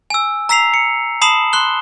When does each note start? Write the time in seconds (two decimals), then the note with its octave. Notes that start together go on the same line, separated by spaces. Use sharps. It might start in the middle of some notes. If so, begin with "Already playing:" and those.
0.10 G#5 E6
0.49 A#5 E6 B6 C7 F7
0.74 C#7
1.21 A5 B5 D#6 C7 E7 F#7
1.53 C6 F#6 G7